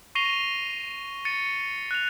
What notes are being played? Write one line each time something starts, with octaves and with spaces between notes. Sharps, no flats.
C#6 A#6 C7 D#7 F7 G7
A6 C#7 D#7
F#6 F7